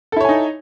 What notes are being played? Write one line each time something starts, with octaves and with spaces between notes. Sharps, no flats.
D#4 E4 A4 C#5 G#5